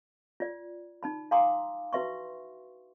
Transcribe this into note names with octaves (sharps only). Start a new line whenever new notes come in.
F4 D5
D#4 A5 B5
F5 G#5 A#5 C6 D6 D#6
E4 F#4 B4 E5 C6 C#6